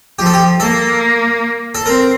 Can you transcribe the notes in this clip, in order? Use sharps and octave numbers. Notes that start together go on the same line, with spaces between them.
F3 G4
A4
G4
A#3 A4
A4
C4 A#4